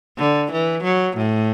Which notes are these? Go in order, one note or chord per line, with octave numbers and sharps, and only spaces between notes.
D3
E3
F#3
A2